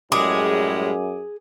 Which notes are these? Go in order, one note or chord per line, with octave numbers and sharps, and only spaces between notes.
F#2 A2 G3 G#3 G#4 D6